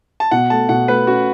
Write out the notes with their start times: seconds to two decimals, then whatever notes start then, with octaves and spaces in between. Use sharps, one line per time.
0.20 A5
0.31 B2 F#5
0.50 A3 A5
0.69 B2 F#5
0.88 A3 B4
1.07 C#4 F#4